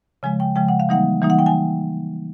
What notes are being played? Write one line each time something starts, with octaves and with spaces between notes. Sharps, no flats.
C#3 F3 G#3 G#5
G5
C#3 F3 G#3 G5
F#5
F5
E3 G3 A#3 D#4 F#5
E3 G3 A#3 D#4
F#5
G5
G#5